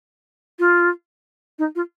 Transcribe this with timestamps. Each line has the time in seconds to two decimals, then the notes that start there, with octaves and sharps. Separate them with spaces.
0.59 F4
1.58 D#4
1.75 F4